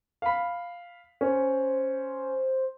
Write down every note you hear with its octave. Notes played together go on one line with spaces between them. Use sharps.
F5 B5
C#4 C5